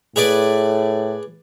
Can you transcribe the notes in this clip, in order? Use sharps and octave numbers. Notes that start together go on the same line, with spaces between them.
A2 G#4 B4 D5